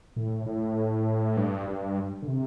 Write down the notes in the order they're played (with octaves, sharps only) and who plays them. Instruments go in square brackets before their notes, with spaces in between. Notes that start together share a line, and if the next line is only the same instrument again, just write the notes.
[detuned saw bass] A2
A2
G2
G2
D3
C3